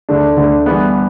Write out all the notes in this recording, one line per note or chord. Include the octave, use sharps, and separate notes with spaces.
D2 D3 A3 D4
D2 D3 A3 D4
E3 G3 B3